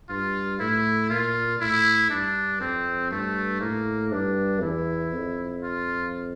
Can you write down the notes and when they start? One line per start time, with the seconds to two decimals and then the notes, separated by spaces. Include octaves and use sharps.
0.09 G2 F4
0.60 A2 E4
1.10 A#2 F4
1.60 A2 E4
2.11 G2 D4
2.60 F2 C4
3.11 G2 A3
3.61 A2 A#3
4.12 G2 D4
4.62 E2 E4
5.12 F2
5.62 F4